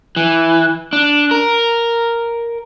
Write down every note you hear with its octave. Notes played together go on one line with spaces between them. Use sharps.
E3
D4
A#4